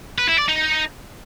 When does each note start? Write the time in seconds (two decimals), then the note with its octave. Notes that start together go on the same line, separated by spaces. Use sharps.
0.18 B4
0.28 E4
0.39 D5
0.49 D#4